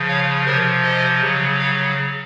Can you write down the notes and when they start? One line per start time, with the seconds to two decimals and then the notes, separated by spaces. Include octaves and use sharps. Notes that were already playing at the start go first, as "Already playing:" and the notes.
Already playing: C#3 F3
0.08 C#5 F5
0.46 C3 F3 A#4 C#5
0.84 C5 D#5
1.22 C#3 F#3
1.59 C#5 F5